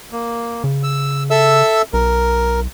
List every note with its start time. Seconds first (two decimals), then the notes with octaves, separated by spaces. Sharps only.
0.12 A#3
0.64 C#3
0.83 E6
1.30 A4 E5 E6
1.93 B1 A#4